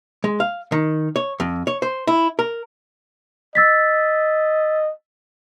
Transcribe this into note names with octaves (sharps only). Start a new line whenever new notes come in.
G#3
F5
D#3
C#5
F2
C#5
C5
E4
A#4
D#5 E6 A6 B6